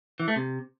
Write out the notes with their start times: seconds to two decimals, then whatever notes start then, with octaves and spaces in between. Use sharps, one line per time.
0.20 E3
0.28 A3
0.36 C3